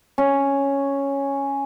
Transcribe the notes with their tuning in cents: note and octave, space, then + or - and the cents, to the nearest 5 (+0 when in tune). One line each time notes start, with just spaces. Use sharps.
C#4 +0